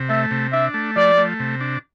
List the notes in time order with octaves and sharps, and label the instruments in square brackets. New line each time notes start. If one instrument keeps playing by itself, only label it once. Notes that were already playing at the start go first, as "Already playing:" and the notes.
Already playing: [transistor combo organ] C3
[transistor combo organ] A3 [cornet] E5
[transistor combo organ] C3
[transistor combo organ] D4 [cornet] E5
[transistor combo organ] A3
[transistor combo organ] F3 [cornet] D5
[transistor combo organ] A3
C3
D4